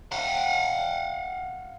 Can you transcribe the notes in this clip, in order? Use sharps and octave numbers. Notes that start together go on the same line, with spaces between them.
F5 F#5